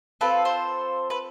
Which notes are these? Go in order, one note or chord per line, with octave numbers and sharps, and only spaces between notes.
C4 F4 A4 B4
C5
B4